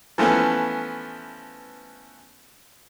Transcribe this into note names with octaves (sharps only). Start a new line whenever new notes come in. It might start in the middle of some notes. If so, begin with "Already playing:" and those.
E3 F3 A3 B3 C#4